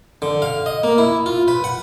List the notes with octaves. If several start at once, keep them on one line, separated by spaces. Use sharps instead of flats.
D3
F5
D#5
A#3
E4
F4
B4
F#5